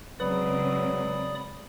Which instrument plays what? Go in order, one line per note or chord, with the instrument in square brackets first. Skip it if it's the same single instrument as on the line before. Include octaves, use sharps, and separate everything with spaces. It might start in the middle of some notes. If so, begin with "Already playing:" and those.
[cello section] C#3 G#3 C4 [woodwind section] F#3 [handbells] B4 [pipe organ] D5 B5 D#6